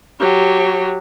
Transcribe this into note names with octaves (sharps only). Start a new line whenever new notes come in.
F#3 G4